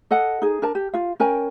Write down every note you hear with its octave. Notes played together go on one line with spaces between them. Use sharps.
A4 D#5 F#5 A5
D#4 G#4
D4 A#4 A5
G4
F4 F5
C#4 A#4 G5 G#5